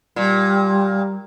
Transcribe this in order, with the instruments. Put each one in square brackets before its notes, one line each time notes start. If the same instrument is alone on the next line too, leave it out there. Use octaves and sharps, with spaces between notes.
[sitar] A#2 [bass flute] G3